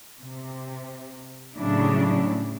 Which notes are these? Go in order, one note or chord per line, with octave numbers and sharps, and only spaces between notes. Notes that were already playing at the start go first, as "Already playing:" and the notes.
C3
A2 C#3 F#3 G3 D4 E4